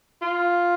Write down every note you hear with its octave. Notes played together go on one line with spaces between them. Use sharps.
F4